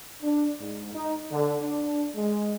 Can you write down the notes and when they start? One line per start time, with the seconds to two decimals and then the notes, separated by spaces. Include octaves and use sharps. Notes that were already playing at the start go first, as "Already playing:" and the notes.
0.22 D4
0.61 G#2
0.94 D#4
1.31 D3
1.63 D4
2.16 G#3